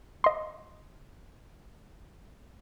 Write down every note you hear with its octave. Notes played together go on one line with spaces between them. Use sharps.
D#5 C6